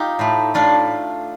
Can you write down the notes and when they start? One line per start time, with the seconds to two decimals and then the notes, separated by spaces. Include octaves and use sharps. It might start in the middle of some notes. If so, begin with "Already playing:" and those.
Already playing: D#4 F4 G4
0.19 A2 A3
0.54 A2 A3 D4 F4